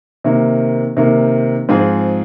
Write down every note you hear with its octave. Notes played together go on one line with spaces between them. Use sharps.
C3 D#3 A#3
C3 D#3 A#3
G#2 F3 C4 F4 G#4